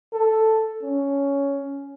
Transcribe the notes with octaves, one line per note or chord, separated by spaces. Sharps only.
A4
C#4